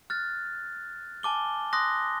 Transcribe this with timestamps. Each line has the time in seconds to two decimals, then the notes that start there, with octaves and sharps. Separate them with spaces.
0.10 F6 F#6 A6
1.23 G#5 A5 D6 G7
1.73 C6 D#6 F#6 A#6